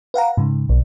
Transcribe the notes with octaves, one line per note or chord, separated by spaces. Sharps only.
B4 F5 F#5 A#5
G#2 C#3
B1